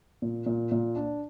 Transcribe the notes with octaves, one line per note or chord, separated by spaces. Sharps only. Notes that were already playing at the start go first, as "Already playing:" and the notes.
A#2
A#2
A#2
D4